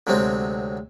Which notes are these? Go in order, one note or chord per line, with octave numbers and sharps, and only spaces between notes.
D2 C3 F#3 G#3 C4